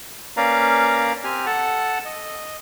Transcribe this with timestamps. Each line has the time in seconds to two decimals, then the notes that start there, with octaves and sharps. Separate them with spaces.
0.37 A#3 C#4 B4 D5 F5 A#5
1.24 C4 G4 G#5 F6
1.46 A4 F#5 A5
2.05 D#5